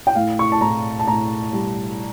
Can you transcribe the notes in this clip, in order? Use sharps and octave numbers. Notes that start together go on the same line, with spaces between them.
G5
A2 F5
C#6
A5
A2 A#5
A5
A2 A#5
G3